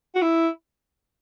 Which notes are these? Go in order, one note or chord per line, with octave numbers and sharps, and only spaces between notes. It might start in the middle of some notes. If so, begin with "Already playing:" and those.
F#4
E4